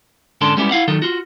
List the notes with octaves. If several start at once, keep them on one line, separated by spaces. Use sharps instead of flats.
G#2 D3 C#4 D4 A4 C6
G3 G#3 B3 C#4 E4 G4
E4 F5 F#5
D#3 F#3 D#4 A4
F4 F#4